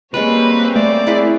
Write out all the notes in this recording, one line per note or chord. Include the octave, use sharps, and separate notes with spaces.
G3 G#3 A#3 C4 C#4 B4 C#5
A3 D5
E4 G#4 B4